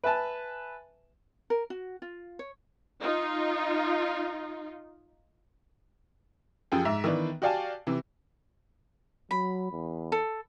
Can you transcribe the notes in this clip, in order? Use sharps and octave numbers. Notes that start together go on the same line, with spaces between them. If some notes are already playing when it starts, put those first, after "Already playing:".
B4 E5 G#5 A5
A#4
F#4
F4
C#5
D#4 F4
F#2 F3 G4 G#4
G#2 E5
D#3 E3 B3 D4
F#4 G4 D5 F5 G#5 A5
C3 E3
F#3 B5
E2
A4